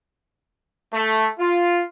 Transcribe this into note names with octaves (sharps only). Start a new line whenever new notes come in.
A3
F4